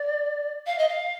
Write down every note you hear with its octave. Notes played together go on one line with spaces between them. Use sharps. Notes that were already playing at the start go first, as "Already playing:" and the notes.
Already playing: D5
F5
D#5
F5